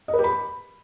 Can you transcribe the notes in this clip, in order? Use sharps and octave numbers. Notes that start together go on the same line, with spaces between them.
D#5
B4
G4
B5